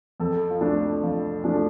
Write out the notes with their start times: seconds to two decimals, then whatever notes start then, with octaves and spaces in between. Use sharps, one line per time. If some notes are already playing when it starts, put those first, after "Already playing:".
0.20 F2 A4
0.50 F4
0.61 F3 A3 D4
1.03 F2 F4
1.44 F3 A3 D4